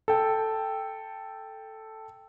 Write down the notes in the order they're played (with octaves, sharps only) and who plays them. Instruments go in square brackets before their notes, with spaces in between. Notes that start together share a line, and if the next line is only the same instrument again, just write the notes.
[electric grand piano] A4 G5